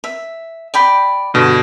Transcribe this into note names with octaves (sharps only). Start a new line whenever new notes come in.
E5
D5 G5 B5
G2 B2 D3